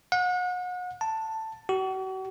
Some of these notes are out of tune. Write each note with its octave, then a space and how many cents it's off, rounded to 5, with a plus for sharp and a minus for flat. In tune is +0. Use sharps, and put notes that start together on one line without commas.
F#5 -35
A5 +10
F#4 +40